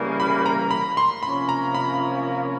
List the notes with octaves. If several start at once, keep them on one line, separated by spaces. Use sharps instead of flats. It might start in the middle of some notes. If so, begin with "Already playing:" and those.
Already playing: C#3 E3 G3 A#3
B5
A#5
B5
C6
C3 F3 A#3 C#4 B5
A#5
B5